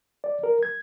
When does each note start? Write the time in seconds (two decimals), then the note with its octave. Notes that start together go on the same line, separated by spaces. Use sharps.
0.24 D5
0.43 A#4
0.63 G#6